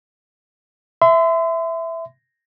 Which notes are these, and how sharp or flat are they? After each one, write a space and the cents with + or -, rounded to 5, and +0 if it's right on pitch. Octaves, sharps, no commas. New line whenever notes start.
E5 +0 C6 -40